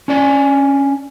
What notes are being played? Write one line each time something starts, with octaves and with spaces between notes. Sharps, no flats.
C#4 D4 D5 G#5